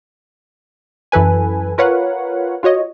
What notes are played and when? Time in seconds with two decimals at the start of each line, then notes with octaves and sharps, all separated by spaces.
1.12 F#2 E3 A4 B4 G#5
1.78 F4 A#4 B4 C#5 F5 F#5
2.63 F4 F#4 C#5 D#5